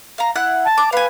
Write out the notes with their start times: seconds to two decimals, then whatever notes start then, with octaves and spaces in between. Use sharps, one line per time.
0.18 F5 A#5
0.36 E4 F#5 F#6
0.65 A5
0.78 D6
0.92 B4 F5 G#5